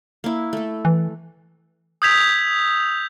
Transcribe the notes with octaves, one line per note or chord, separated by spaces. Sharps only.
A#3 E4
A3 A4
E3
D#6 E6 G6 G#6 B6 F7